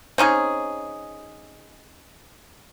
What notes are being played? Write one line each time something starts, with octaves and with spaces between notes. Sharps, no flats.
C4 C#4 D#4 G#4